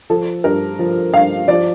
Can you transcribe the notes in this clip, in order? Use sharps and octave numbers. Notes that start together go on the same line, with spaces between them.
F3 A4
G2 A#4
F3
G2 F5
F3 D5